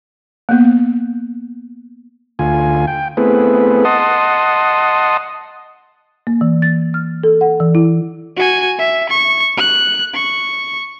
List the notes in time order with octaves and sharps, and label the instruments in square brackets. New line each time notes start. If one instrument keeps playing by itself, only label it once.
[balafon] A#3 B3
[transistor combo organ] D2 F4 G#5
G5
A3 B3 C4 E4 G#4 B4
D#5 F#5 A5 C6 D#6
[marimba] A#3
E3
A6
F6
A4
F#5
E3
E4
[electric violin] F#4 G#5
E5
C#6
F#6
C#6